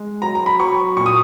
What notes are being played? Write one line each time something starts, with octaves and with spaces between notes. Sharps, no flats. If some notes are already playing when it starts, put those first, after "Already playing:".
Already playing: G#3
F#3 A#5
A#5
B5
F#3 C#6
A#2 C#6
D#6